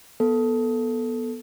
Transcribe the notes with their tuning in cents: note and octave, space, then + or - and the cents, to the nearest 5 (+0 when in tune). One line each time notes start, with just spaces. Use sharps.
B3 -20 A4 +0